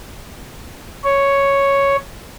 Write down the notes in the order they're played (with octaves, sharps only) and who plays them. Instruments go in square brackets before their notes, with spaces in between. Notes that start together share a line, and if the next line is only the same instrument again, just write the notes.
[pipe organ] C#5